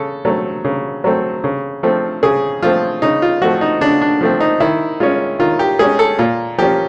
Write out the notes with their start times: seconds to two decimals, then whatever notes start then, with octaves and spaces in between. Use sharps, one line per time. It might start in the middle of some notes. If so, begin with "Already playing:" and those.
Already playing: C#3 A4
0.25 F#3 A3 C4
0.65 C#3
1.04 F#3 A3 C4
1.44 C#3
1.83 F3 A3 C4
2.23 C#3 G#4
2.62 F3 A3 C4 F4
3.02 C#3 D#4
3.22 F4
3.41 F3 A3 C4 F#4
3.61 D#4
3.81 C#3 D4
4.01 D4
4.21 F3 A3 C4
4.40 D#4
4.60 D#3 E4
5.00 G#3 C#4 F4
5.39 D#3 F4
5.59 G4
5.79 G#3 C#4 G#4
5.99 A4
6.19 A#2 F4
6.58 F3 A#3 C#4 G4